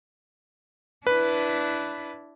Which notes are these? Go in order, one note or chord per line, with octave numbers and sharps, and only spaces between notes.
D4 E4 B4